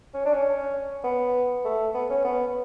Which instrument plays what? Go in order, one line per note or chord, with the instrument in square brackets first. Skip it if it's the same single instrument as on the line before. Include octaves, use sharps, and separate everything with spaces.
[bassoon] C#4
D4
C#4
B3
A3
B3
C#4
B3